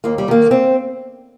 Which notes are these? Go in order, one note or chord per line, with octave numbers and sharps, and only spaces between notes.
D#2 A#3
G3
D#3 A#3
C4